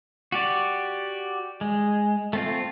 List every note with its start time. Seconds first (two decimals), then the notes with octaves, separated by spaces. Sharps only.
0.32 F#4 G4 D5
1.61 G#3
2.33 A3 C4 F4